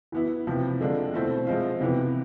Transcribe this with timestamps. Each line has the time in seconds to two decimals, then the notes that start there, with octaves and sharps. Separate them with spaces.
0.12 E3 B3 E4
0.47 C3 F3 B3 E4
0.81 D3 G#3 D4 F4
1.13 B2 A3 C4 E4
1.47 F3 G#3 C4 F4
1.81 C3 E3 B3